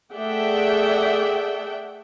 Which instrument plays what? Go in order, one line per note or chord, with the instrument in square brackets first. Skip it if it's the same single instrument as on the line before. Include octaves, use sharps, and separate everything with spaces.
[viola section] A3 G#4 D5 E5 F#5 G5